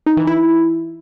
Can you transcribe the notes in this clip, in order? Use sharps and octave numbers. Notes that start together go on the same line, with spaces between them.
D#4
E3
E4